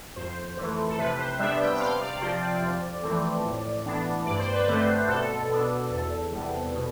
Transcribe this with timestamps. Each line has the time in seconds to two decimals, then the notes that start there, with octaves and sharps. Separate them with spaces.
0.16 F2 C5
0.57 E3 A3
0.88 A4
0.98 C3 B4
1.18 C5
1.39 G3 B3 D4 E5
1.60 G5
1.74 G5
1.80 C3 F5
2.01 D5
2.21 F3 C4 C5
2.42 D5
2.62 F2
3.03 E3 A3 C4
3.44 A2
3.85 E3 B3 D4
4.26 G2 D5
4.39 C5
4.53 B4
4.65 D3 A3 C4 C5
5.08 B2 A4
5.49 B3 D4
5.90 E2 A4
6.31 C3 G3 B3
6.72 B2